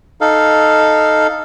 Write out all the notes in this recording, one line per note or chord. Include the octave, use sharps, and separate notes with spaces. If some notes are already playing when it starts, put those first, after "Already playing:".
D#4 A4 F5